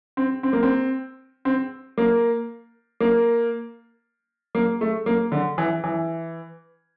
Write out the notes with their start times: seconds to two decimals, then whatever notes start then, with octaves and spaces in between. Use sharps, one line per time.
0.17 C4
0.43 C4
0.53 A#3
0.63 C4
1.45 C4
1.98 A#3
3.00 A#3
4.55 A#3
4.81 A3
5.06 A#3
5.32 D3
5.58 E3
5.84 E3